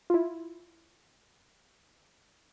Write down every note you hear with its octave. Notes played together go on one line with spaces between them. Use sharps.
E4 F4